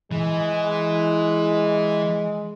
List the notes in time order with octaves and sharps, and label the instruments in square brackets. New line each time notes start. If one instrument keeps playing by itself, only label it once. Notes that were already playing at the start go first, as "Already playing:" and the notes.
[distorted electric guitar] E3 [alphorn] G#3